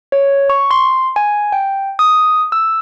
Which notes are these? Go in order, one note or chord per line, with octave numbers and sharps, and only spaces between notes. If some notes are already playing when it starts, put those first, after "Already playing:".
C#5
C#6
C6
G#5
G5
D#6
E6